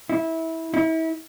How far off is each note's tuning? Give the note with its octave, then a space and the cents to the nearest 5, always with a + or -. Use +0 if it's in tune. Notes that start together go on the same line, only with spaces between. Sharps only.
E4 -20
E4 -35